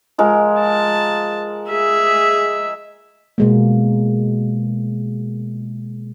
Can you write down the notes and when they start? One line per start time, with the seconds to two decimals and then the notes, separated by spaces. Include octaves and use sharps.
0.18 F3 G#3 A#4
0.60 A5
1.69 G#4 E5
3.38 B2 G#3 A#3